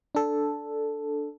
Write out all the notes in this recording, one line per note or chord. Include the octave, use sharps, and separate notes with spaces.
D4 A4